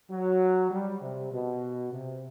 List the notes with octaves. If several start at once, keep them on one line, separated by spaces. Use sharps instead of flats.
F#3
G3
C3
B2
C3